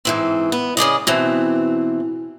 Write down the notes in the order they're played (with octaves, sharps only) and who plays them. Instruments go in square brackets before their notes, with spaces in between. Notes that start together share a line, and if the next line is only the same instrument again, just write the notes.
[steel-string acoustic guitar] G#2 E3 C4
B3
C#3 G#4 D5 D#5
B2 E3 C4